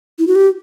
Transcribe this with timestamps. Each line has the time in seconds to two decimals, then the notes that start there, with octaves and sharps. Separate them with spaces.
0.19 E4
0.27 F#4
0.35 G4